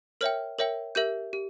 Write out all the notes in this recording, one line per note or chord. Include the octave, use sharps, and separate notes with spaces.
A#4 C#5 E5 G5 F6
A#4 C#5 E5 G5
G4 A#4 E5 G6
G4